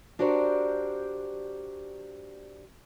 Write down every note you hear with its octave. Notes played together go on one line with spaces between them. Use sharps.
D4 F#4 G4 A#4 C5 D5